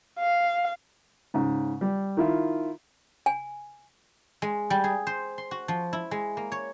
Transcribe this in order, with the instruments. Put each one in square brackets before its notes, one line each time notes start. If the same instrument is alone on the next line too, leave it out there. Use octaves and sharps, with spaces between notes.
[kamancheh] F5
[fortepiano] G#2 C#3
G3
D#3 E4 F4
[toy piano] G#5
[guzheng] G#3
G3
G#4
C5
C6
F#4
F3
E4
G#3
A#3
C#5